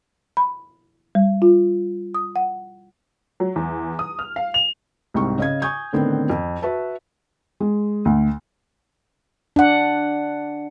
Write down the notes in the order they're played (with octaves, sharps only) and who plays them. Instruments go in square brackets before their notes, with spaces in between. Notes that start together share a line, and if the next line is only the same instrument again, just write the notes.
[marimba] B5
G3
F4
D#6
F#5
[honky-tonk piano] F#3
E2
D#6
F6
F5
F7
[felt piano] C2 G#2 C4 C#6
C#3 D#5 F5 G#6
G#5 C#6 D#6 G6 G#6
A2 D3 D#3 B3 C4
F2
F#4 B4 E5 A5
G#3
D2
[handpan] D4 F#5